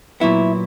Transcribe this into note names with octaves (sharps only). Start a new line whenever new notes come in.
A#2 F#3 B3 E4